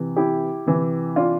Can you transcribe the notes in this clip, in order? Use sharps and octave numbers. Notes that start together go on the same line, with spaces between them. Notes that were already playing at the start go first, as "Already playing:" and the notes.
Already playing: C3 E3
E4 G4
C3 E3
D4 F4